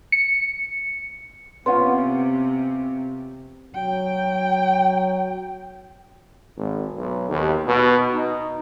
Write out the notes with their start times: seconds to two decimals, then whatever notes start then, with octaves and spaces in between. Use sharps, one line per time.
0.12 C#7
1.66 C3 B3 C#4 F4 F#5 C6
3.75 F#3 G5
6.57 G#1
6.94 B1
7.29 D#2
7.67 B2
8.13 D#4